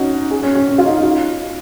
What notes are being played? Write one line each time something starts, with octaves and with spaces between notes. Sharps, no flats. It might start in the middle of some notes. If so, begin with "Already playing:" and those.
Already playing: C#4 D#4 F#4
G#4
C#4
C#4
C#4
F4
D#4
D#4
F4